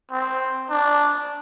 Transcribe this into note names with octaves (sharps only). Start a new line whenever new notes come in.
C4
D4